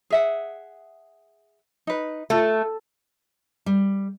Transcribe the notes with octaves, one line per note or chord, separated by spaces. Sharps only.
G#4 E5 F#5
D#4 B4
A3 F4 A4
G3